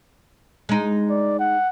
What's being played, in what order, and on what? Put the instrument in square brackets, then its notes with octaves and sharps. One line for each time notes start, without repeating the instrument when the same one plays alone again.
[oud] G#3 D#4
[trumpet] D5
F#5